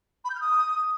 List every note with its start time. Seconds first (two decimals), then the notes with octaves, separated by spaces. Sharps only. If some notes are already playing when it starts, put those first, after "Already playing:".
0.24 B5
0.30 G6
0.35 F6
0.40 D#6